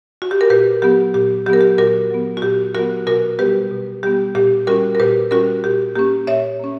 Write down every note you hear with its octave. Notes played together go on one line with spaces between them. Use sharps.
F#4
G4
A#4
A#2 G4 B4
F#3 B3 G4
A#2 G4
F#3 B3 G4 A#4
G4
A#2 F#4 A#4
F#3 B3
F#4
A#2 G4
F#3 B3 F#4 A#4
B2 F#4 A#4
G3 B3 G4 B4
B2
G3 B3 G4
A#2 G4
G3 C#4 F#4 A#4
A#4
A#2 G4 B4
G3 C#4 F#4 A#4
A#2 G4
A#3 C#4 G4
A#2 C#5 E5
A#3 C#4